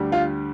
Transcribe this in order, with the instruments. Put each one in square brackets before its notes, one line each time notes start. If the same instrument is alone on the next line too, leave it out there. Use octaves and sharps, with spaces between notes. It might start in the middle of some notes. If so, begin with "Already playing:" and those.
Already playing: [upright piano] D2 D3 G3
F4